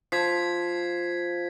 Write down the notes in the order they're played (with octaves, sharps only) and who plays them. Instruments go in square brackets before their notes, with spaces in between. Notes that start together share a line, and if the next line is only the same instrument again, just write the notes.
[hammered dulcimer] F3 [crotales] G#6 B6 C7